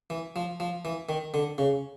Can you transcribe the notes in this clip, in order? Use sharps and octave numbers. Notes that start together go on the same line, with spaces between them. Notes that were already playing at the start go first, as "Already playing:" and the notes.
E3
F3
F3
E3
D#3
D3
C#3